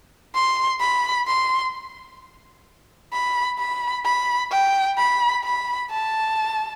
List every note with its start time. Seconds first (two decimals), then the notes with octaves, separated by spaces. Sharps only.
0.35 C6
0.80 B5
1.27 C6
3.12 B5
3.59 B5
4.05 B5
4.52 G5
4.97 B5
5.44 B5
5.90 A5